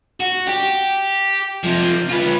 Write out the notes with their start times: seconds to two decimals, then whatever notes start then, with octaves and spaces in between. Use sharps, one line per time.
0.20 F#4
0.48 G4
1.64 C3 F3
2.10 F4 B4